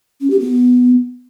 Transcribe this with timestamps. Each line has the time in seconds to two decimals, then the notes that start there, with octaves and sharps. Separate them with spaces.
0.21 C#4
0.30 G4
0.40 B3